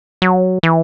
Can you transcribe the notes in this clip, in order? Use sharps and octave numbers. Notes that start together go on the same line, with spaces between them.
F#3
E3